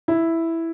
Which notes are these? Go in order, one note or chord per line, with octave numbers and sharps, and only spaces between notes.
E4